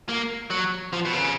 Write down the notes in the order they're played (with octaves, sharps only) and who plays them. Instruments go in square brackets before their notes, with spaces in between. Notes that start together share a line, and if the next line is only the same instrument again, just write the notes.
[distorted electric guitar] A#3
F#3
F3
B2
C#3